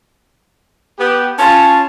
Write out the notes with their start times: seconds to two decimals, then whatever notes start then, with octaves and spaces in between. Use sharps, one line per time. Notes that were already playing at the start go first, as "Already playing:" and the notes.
0.99 B3 G4
1.38 C#4 F4 A5